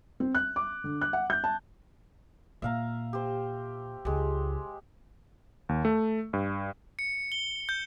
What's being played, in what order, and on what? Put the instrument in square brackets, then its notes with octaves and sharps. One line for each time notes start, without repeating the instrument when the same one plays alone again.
[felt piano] C4
F#6
D6
D3
F#6
F#5
G6
A5
[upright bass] A#2 [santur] E5 F5 A#5
[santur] G4 C5
[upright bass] C#2 [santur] G#3 G4
[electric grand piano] D#2
A3
G2
[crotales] C#7
G7
G6